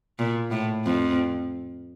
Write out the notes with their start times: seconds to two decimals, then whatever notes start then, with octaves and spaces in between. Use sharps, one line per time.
0.19 A#2
0.51 A2
0.85 F2